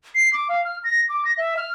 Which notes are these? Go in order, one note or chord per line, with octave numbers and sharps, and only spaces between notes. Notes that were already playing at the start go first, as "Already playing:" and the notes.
C7
D6
F5
F6
A#6
D6
A#6
E5
F6